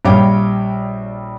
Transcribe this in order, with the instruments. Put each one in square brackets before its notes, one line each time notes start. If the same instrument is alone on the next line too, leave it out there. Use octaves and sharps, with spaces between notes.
[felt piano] A#1 G3 C#5 F5 G5 D6